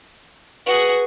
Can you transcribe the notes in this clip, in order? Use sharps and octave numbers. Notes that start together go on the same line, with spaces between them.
F#4 G#4 B4